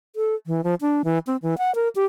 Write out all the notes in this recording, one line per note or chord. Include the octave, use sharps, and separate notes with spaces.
A4
E3
F3
D4
E3
C4
E3
F#5
A#4
G4